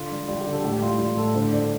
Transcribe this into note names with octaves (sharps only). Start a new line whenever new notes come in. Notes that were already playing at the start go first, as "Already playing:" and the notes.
Already playing: D3 F4
G3
G3 F4
G4
D3
A4
A2 G4
G3 F4
G3 F4
A2 A4
D3 C5
A3 D5